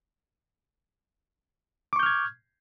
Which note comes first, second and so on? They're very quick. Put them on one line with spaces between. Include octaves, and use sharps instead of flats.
D6 C#6 G6 F6 G#6